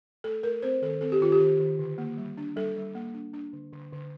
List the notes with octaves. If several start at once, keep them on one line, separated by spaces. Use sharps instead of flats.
A3 A4
A3 A#4
C4 C5
D#3 A4
C4 A4
G4
D#3 F4
G4
D#3
D#3
D3
A#3
G3
D4
G3 A4
G3
A#3
D4
D4
D3
D3
D3